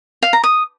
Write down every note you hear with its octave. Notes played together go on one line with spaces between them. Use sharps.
F5
A#5
D#6